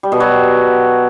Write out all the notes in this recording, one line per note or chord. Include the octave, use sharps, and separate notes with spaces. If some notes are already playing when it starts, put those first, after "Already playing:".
G3
B2
F#3